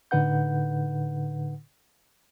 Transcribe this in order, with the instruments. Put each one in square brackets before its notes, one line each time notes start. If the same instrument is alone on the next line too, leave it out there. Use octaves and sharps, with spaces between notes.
[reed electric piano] A2 D3 D#4 B4 F#5 G6